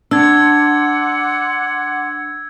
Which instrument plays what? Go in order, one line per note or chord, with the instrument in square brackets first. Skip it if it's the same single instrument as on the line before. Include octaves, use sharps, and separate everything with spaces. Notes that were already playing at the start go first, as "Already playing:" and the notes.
[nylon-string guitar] D4 [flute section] F#5 C6 D6 [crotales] E6 G#6